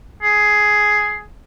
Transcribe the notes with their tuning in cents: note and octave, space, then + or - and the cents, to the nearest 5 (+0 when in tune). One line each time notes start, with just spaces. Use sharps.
G#4 +10